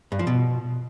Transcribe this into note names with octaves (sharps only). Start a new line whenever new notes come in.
G2
F3
B2